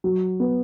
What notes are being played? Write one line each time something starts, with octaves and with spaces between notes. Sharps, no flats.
F#3
B3